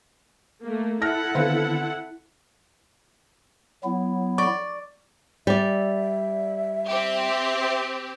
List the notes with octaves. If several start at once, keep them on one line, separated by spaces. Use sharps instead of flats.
A3 A#3
E4 A4 E5 F#5 A5 F6 F#6 A#6
D3 D#3 B3 C4 B4 F5
F#3 B3 E4
D5 C#6
G3 D5 E5
C4 G4